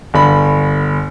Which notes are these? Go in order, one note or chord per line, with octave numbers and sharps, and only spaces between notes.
G1 B5